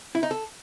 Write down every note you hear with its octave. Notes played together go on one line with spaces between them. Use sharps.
E4
D#4
A4